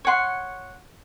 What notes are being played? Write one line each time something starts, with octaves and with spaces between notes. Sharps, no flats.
C#5 F#5 C6